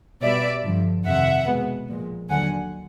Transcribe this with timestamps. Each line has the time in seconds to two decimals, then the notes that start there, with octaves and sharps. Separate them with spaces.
0.21 B2 G3 B3 D5 E5
0.64 G2 D3 F3
1.05 F2 C3 D#3 E5 F#5
1.47 B2 G#3 B3
1.88 A#2 F3 G#3
2.29 D#2 D3 F#3 F#5 G#5